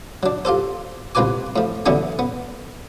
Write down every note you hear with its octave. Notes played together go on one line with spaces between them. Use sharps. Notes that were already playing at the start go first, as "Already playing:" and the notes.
F#3 D4
F4 G4 A4 C5
C2 C4 F4 B4 G#5 D6
A2 F3
D3 E3 F#3 B3 C#4 D4
B3